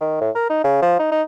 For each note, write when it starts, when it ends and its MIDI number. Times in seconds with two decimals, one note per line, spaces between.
0.01 0.17 51
0.21 0.30 45
0.35 0.49 70
0.50 0.62 63
0.64 0.82 49
0.82 0.96 53
0.99 1.08 63
1.12 1.22 63